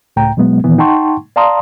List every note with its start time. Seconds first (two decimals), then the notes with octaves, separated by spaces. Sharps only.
0.16 C#2 A2 G5 A#5
0.37 B2 F#3 G#3 B3
0.64 A#2 D#3 E3 B3
0.78 D#4 F#5 G5 A5 C6 C#6
1.36 D5 F5 A5 A#5 C6 D#6